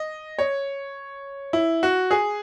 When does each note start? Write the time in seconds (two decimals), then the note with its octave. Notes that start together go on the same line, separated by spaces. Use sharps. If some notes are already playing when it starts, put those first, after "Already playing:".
Already playing: D#5
0.39 C#5
1.53 E4
1.83 F#4
2.11 G#4